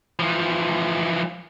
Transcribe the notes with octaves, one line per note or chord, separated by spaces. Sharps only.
E3 F3